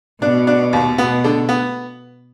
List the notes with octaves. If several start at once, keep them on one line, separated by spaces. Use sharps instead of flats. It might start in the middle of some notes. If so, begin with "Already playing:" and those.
B2 D4
D4
D#2
B2 B3
D3
B3